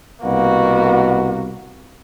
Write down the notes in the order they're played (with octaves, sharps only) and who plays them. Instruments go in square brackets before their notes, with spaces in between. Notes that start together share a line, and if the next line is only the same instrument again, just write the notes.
[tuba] C2 [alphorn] B2 [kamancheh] A#3 F#4